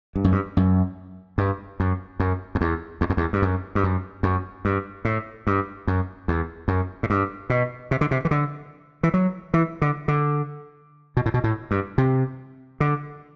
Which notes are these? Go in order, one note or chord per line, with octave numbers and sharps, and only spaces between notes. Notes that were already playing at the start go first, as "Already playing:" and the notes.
G2
F#2
G2
F#2
G2
F#2
F#2
F#2
E2
E2
F#2
E2
G2
F#2
G2
F#2
F#2
G2
A2
G2
F#2
E2
F#2
A2
G2
B2
C3
D3
C3
E3
D3
E3
F#3
E3
D3
D3
B2
A2
B2
A2
G2
C3
D3